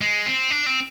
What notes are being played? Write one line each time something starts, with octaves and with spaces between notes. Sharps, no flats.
G#3
C4
D4
C4